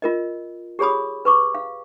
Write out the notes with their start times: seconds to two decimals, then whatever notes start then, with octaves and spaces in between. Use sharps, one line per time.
0.02 F4 A#4 D#5
0.79 G4 G#4 C#5 B5 D#6
1.25 B4 C#6 D6
1.55 F5